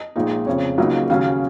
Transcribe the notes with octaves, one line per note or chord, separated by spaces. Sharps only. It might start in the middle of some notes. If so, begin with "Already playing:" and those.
Already playing: D#5
A#1 A#2 G#3 D#4
F1 F2 C#3 C#5
C#2 C#3 F#3 A#3 D#4
D#2 C#3 F#3 C#4 F5